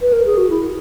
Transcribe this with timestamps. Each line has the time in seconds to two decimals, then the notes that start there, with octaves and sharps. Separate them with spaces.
0.00 B4
0.13 A#4
0.25 G#4
0.38 F#4
0.50 E4